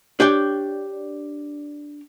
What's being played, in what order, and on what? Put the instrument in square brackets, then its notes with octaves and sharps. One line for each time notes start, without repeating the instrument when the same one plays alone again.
[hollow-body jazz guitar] D4 G4 C#5 D5 G5